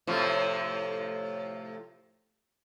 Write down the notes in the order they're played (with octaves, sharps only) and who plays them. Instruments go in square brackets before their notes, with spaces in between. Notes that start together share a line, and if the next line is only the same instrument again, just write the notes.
[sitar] A2 C3 F3